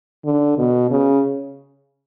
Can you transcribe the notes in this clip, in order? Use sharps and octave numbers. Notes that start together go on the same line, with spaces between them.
D3
B2
C#3